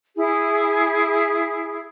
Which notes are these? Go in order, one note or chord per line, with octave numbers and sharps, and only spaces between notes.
E4 G#4